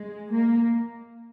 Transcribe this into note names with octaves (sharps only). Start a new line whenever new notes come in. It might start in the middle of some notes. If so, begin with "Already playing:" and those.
Already playing: G#3
A#3